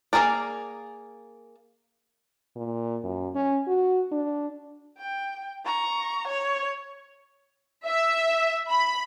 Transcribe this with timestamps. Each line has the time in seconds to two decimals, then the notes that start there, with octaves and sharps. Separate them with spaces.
0.13 A#3 C4 G#4 A#4 D5
2.56 A#2
3.04 F#2
3.35 C#4
3.67 F#4
4.12 D4
4.98 G5
5.66 A#5 C#6
6.28 C#5
7.87 E5
8.69 B5